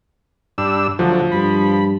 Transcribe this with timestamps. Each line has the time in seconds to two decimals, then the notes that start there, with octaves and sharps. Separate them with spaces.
0.58 G2 D4 E6
0.99 D2 F3 F#3 A3
1.32 G2 B5